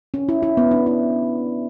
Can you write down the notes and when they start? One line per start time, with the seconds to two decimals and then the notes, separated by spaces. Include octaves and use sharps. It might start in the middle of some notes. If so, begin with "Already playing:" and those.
0.14 C#4
0.29 E4
0.43 E4
0.57 B3
0.71 D4
0.86 E4